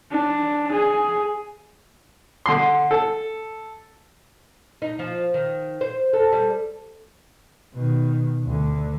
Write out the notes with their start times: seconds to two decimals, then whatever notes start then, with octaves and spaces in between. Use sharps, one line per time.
0.11 D4
0.72 G#4
2.46 D3 C6
2.91 A4
4.82 D#4
4.99 F3
5.34 D#3
5.81 C5
6.13 A4
6.32 G3
7.74 B2 D#3
8.44 D2 D3